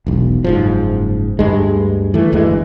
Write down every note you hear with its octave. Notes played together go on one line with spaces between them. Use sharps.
E1 B1
F#1 G#2 F3
D2 G2 G#3
E3 A3
G1 D2 E3 G#3